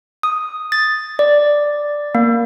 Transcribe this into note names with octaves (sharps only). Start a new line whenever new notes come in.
D#6
A6
D5
A#3